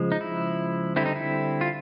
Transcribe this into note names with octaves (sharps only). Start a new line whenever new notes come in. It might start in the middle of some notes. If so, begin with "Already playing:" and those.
Already playing: C#3 F3 G#3
D#4
E4
D3 G3 C4 E4
D#4
E4
F4